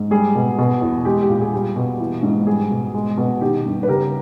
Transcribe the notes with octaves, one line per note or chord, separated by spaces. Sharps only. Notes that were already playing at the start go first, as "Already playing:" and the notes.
Already playing: G#2
G3 G#4
B2
B2
E2
G#3 G4
G4
A#2
G#4
G3 G4
B2
E3
G#2
G3 G#4
B2
G#3
B2
D#3 G4
G2
B4
C#3 G4 A#4